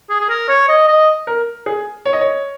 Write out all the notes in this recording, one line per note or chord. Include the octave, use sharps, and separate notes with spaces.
G#4
G#4
A#4
C#5
D#5
D#5
A#4
G#4
C#5
D#5
C#5